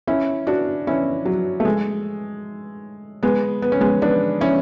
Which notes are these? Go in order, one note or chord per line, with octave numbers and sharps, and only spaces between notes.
C#4 E4
D4 F#4
C#4 E4
F#3
A3
G#3
G#3 B3
B3
C#4
G#3 B3
B3 D4
C#4 E4